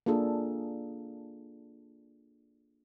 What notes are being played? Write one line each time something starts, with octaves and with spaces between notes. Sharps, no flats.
A#3 D4 F4 G#4 A4